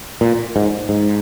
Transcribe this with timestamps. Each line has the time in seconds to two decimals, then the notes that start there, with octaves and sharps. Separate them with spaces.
0.21 A#2
0.56 G#2
0.89 G#2